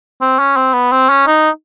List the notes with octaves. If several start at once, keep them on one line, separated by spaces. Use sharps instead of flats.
C4
C#4
C4
B3
C4
C#4
D#4